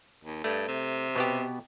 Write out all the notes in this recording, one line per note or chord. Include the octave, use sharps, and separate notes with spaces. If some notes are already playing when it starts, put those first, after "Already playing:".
D#2
G2 A3
C3
B2 B3 G4